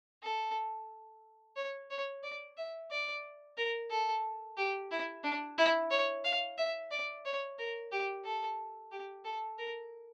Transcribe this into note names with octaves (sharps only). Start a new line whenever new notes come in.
A4
C#5
C#5
D5
E5
D5
A#4
A4
G4
E4
D4
E4
C#5
F5
E5
D5
C#5
A#4
G4
A4
G4
A4
A#4